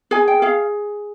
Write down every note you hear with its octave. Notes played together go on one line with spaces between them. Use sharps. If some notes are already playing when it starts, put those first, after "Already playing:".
G#4 G#5
G5
G#4 F5